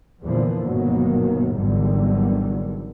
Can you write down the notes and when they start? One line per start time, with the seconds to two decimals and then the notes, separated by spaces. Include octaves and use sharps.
0.20 E2 A#2 D3 E3 F3
0.62 G1 B2 D#3 F3 F#3 A#3
1.51 G#1 E2 D3 D#3 F#3 G3